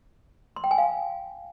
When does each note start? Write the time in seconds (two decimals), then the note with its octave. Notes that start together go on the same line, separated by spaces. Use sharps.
0.56 C6
0.64 G5
0.71 G#5
0.78 F5